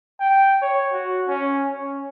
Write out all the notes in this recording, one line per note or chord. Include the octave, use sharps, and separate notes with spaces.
G5
C#5
F#4
C#4
C#4